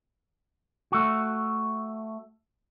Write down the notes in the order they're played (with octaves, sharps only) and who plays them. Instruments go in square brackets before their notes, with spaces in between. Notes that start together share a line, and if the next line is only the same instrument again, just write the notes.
[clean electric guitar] A3 F#4